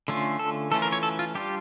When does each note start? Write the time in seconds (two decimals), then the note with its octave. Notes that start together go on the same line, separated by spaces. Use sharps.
0.08 D3 A3 C#4 F4
0.39 A4
0.71 E3 A3 C#4 F4 A4
0.82 A#4
0.93 C#5
1.03 A4
1.19 F4
1.35 G3 D4 F4 G4